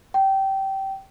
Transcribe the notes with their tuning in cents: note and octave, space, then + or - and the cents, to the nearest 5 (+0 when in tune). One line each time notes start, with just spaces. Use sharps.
G5 -20